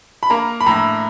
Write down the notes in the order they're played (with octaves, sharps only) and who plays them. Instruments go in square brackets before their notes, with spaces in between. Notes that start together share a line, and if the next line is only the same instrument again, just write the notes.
[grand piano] B5
A#3 A#5
B5
A2 A#5